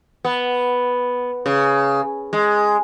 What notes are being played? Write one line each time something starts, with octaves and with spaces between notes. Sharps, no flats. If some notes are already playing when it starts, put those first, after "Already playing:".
B3
C#3
G#3